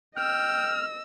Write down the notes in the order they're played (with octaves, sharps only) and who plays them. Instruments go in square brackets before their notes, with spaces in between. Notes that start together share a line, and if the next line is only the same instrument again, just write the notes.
[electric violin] D#5 E6 [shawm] G5 [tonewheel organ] F6